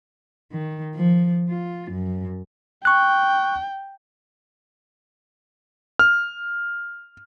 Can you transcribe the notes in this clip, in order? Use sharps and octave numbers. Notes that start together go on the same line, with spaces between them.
D#3
F3
F4
F#2
G5 C#6 F#6
F6